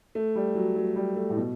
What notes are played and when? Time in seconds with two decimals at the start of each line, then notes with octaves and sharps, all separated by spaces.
0.15 A3
0.35 G3
0.55 F#3
0.76 F#3
0.96 G3
1.16 A3
1.30 A2
1.36 B2